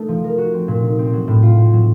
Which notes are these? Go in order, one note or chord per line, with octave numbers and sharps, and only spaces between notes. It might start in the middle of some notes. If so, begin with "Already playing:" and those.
Already playing: A3 D#4 A4
F3
A#4
F#4
C4
A#2
D#4
C4
F#3
A2
F4
C4
F#3